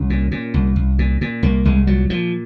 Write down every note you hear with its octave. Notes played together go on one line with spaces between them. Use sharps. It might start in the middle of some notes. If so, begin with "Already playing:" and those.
Already playing: C2 C#4
A#2
A#2
C2
C2
A#2
A#2
C2 A#3
C2 G#3
A#2 F#3
A#2 F3